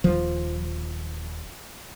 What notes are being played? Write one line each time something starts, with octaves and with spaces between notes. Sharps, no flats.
D#1 F3